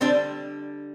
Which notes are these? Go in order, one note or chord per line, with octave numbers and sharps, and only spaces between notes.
D3 G3 C4 D4